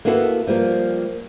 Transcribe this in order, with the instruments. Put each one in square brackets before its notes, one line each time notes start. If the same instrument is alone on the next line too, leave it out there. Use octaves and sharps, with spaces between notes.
[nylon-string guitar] A#3 B3 E4 F#4 G#4 A4
F3 G3 A#3